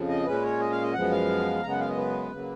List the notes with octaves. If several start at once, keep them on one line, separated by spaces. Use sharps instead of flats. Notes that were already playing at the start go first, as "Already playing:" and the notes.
Already playing: F2 C#3 F3
D#5
A#2 G#3 C#4 B4
C#5
D#5
F5
D#5
F#2 F3 G#3 B3 F#5
F5
F#2 C#3 G#3 B3 A#5
F#5
F5
D#5
B4
C#3 F#3 A#3